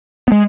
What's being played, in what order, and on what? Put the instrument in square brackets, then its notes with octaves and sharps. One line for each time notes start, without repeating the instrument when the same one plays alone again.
[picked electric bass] B3
G#3